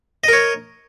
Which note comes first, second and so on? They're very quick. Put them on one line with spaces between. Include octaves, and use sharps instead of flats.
D#5 A#4 C#5